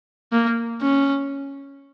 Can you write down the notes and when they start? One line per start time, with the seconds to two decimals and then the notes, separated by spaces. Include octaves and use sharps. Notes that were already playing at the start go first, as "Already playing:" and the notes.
0.32 A#3
0.82 C#4